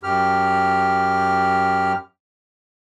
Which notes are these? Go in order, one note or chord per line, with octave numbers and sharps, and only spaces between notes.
F#2 G4 F6